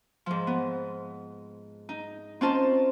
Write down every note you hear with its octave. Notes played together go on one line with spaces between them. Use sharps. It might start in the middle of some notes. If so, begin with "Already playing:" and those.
G#2 F3
B3
D#4
C4 C#4 D#4 F4 C5 A5